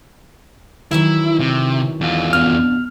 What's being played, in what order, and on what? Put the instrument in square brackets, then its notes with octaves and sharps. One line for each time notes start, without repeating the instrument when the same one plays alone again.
[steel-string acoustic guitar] D#3 E3 F#3 [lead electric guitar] E4
[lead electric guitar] C3
E2 F4
[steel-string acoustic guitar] F2 B2 D4 [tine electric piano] F6